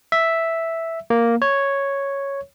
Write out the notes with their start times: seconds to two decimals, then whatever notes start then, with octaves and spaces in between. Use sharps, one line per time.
0.12 E5
1.10 A#3
1.42 C#5